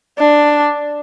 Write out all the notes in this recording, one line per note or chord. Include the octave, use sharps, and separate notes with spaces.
D4